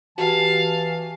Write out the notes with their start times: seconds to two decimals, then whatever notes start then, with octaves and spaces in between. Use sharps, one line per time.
0.18 E3 F#4 G4 F5 G#5 A5